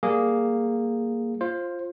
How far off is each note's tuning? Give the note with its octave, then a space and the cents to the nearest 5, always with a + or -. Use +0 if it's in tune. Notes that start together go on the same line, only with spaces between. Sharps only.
G3 +0 A#3 +0 G#4 -5
F4 -5 C5 +20